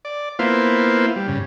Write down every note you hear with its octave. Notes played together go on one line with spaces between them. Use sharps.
D5
A#3 B3 E4 F4 C5
G3
G2 C#3